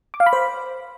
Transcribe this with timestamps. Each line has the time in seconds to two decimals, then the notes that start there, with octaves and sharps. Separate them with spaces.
0.14 D6
0.20 F5
0.26 B5
0.33 C5